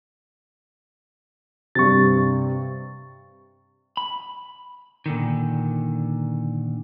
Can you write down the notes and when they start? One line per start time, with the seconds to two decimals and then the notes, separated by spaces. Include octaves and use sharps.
1.75 G2 C3 C#6 A6
3.97 B5
5.06 A#2 D3 D#3